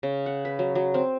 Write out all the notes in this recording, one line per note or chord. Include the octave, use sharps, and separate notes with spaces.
C#3
F#5
B4
F#3
F#3
C4